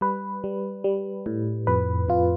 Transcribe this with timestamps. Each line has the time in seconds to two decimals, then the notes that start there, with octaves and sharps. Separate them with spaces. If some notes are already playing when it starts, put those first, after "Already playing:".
0.01 G3 B4
0.44 G3
0.84 G3
1.26 A2
1.67 F2 B4
2.08 F2 F4